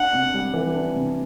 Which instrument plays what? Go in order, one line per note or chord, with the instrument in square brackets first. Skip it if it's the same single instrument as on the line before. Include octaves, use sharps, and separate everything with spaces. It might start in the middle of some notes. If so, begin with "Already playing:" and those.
Already playing: [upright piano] D4 [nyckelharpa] F#5
[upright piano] C3
G3
E3
D4
C3